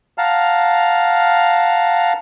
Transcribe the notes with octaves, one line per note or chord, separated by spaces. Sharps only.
F5 F#5 A5 A#5 F6